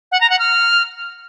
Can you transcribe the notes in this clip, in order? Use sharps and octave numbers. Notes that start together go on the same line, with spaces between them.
F#5
A#5
F#5
F6